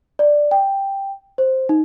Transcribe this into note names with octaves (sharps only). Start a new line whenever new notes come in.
D5
G5
C5
D#4